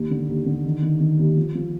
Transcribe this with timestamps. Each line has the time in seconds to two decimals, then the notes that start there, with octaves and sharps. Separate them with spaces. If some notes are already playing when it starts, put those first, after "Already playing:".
Already playing: D#2
0.11 D3
0.28 D#2
0.46 D3
0.65 D#3
0.82 D#3
1.00 D#3
1.19 D#2
1.37 F3
1.55 F3